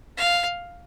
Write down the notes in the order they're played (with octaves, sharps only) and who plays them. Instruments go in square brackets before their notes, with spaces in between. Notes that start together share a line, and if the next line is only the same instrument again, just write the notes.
[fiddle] F5